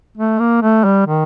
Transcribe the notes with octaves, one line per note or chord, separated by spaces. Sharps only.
A3
A#3
A3
G3
D#3